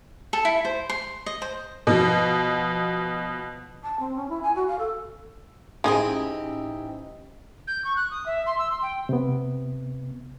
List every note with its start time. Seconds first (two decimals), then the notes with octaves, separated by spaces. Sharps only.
0.33 A4
0.45 E4
0.65 C5
0.89 C6
1.26 D#5
1.42 C5
1.87 B2 F3
3.82 A5
3.99 C4
4.16 C#4
4.29 E4
4.42 G#5
4.56 F#4
4.67 F5
4.79 A4
5.84 A1 E3 G#3 C4 D#4 E4 G4 G#4
7.67 G6
7.84 C#6
7.96 F#6
8.11 D#6
8.26 E5
8.46 C6
8.58 E6
8.70 C6
8.82 G5
9.09 C3 B3